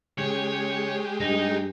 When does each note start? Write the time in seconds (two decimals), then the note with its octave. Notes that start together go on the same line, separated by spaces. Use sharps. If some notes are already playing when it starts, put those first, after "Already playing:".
0.18 C#3 G#3 G4 C#5
1.21 G2 D#4